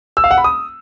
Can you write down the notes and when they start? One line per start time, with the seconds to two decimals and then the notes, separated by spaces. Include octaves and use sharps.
0.17 E6
0.24 F5
0.31 F#5
0.38 B5
0.44 D#6